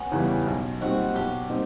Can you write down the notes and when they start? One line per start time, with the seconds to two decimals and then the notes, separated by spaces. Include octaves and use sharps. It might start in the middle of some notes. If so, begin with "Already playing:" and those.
Already playing: B3 C#4
0.12 E2 C#3 E3 G3
0.47 B1
0.81 A#2 G3 C4 D#4 F#4
1.15 B1 G4
1.49 A#2 G3 C4 D#4